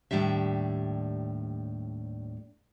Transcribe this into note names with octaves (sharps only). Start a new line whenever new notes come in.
D#2 A2 G3 D4 E5